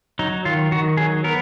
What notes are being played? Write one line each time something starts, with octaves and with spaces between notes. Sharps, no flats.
F#3 D#4
D#3 F4
D#3 F#4
F#3 G#4
B3 A#4